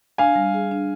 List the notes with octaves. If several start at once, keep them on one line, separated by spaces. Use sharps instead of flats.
D4 F5 G#5
G3
G#4
D4